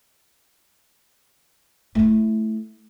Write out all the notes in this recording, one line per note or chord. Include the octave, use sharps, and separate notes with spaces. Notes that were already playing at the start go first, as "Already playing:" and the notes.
A3 E4